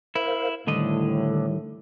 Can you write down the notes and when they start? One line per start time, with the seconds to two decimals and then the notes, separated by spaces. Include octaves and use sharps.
0.15 E4 A#4 C5 F5
0.67 D2 A2 D3 D#3 G3 D#5